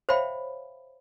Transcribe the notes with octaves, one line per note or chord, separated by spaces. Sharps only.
C5 C#5 E5 F5 G5 B5